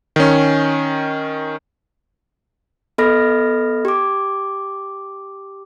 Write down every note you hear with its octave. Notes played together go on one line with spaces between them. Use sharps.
D#3 C#4
B3 A4 D#5 B5 F6 A#6
G4 D6